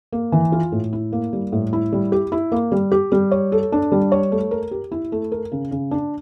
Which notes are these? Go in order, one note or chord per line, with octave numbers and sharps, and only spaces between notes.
A#3
E3
F4
A2
E4
A#3
G3
A2
E4
G3
G4
E4
A#3
G3
G4
G3
C#5
A4
D4
G3
C#5
A3
A#4
G4
E4
A3
A#4
C#3
C#3
D4